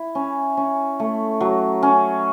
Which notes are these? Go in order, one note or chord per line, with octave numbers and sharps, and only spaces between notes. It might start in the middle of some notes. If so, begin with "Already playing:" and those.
Already playing: E4
C#4
C#4
A3
F#3
C#4